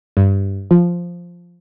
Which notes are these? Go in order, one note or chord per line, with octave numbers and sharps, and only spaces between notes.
G2
F3